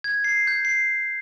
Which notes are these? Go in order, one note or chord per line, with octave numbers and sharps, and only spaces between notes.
G#6
C7
G6
C7